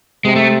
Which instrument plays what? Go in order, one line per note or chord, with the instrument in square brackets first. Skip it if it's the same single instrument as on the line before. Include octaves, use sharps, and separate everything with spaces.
[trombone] C3 [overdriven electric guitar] G#3
[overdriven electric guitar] A3